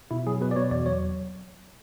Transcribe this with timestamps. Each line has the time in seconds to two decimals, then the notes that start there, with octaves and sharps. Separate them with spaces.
0.11 B2 E4
0.27 F#3 G#4
0.41 B2 B4
0.51 D5
0.56 B2 C#5
0.71 E2 D5
0.86 F#3 C#5